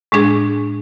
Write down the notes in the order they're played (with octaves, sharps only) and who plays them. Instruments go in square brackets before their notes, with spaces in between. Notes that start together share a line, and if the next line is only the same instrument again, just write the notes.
[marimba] A2 G#3 D4 G#4